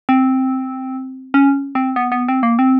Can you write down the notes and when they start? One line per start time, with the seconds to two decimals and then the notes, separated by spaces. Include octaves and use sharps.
0.09 C4
1.34 C#4
1.75 C4
1.96 B3
2.12 B3
2.28 C4
2.43 A#3
2.59 C4